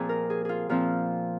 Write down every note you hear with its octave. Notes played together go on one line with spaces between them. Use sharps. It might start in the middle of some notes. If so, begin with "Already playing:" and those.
Already playing: A#2 F3 C4 G#4
A#4
G#4
F4 G#4
A#2 F3 C4 F4